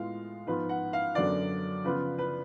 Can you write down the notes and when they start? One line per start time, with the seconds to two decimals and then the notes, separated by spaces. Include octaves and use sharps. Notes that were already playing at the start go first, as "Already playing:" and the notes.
Already playing: A2 G#3 B3 F4 F5
0.46 G#2 F3 B3 F4 B4
0.69 F#5
0.93 F5
1.15 F#2 D3 F#3 B3 D4 D5
1.84 C#3 F3 B3 F4 B4
2.18 B4